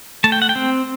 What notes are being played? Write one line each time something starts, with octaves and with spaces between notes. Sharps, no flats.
A3 A5
G5
F#5
G5
C4